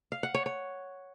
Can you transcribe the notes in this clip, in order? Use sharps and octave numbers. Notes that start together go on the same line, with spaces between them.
F5
F#5
C#5
C#5